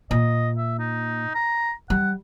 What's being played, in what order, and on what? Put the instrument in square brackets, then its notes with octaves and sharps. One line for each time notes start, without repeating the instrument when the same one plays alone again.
[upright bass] A#2 [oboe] D#5
[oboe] E5
D#4
A#5
[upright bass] G3 [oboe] F#5